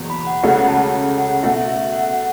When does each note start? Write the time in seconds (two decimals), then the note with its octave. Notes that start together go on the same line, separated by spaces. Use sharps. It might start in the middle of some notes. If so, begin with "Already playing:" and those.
Already playing: F#1 E2 B2
0.10 B5
0.27 F#5
0.43 C#2 C#3 A3 C#4 F#4 F#5
0.68 A5
0.93 A5
1.18 F#5
1.43 B2 A3 F#4 E5
1.68 E5
1.92 F#5